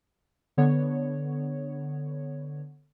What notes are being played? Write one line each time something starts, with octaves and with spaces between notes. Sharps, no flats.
D3 B3 C#5